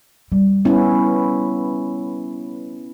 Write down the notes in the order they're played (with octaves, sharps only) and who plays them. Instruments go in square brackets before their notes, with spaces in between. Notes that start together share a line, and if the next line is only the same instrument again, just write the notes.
[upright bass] G3
[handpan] B3 C#4 E4